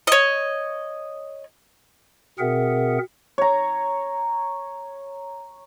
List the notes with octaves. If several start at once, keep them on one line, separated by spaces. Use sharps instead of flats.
C#5 D#5
B2 C4 G#4 A#4 E5 F#5
C#5 A#5